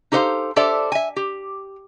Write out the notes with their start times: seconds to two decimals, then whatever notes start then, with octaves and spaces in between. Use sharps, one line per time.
0.12 D#4 G4 A4 C5 F5
0.56 D4 G4 A4 C5 D5 E5
0.92 E5 G#5
1.16 G4